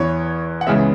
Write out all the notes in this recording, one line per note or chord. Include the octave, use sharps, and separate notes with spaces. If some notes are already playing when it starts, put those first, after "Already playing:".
Already playing: E2 E3 B3 C#5
F#5
C#2 C#3 E3 G#3 B3 E5